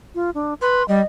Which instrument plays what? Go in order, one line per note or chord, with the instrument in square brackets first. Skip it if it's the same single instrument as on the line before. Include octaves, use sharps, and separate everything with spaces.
[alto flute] F4
D4
[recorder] B4 [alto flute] C6
[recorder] G3 [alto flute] D#5